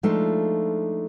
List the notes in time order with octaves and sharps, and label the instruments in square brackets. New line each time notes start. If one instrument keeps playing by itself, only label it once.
[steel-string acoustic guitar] F3 G#3 A3 D4 D#4 F4